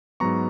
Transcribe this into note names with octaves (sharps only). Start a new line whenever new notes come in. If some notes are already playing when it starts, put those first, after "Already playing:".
G#2 F#3 B3 A#5 C#6